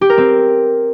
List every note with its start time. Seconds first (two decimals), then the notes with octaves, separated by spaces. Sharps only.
0.01 G4
0.10 A#4
0.18 C4